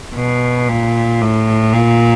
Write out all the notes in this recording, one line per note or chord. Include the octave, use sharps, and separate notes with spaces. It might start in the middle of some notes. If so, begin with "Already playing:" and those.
B2
A#2
A2
A#2